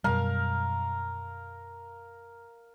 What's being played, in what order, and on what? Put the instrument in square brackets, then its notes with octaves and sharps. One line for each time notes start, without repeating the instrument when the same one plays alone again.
[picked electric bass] F#2 B2 G3 [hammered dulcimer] A#4 F5